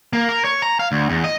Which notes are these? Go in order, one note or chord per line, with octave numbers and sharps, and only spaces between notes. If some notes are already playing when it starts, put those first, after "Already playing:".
A#3
A#4
C#5
A#5
F5
D2
E2
D#5